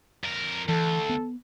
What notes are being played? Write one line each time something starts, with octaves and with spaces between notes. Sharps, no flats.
F2 A#4
D2 E3 A4
B3